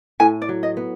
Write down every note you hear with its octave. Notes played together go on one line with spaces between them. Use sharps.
A2 G#5
D5
F#3
D#5
B3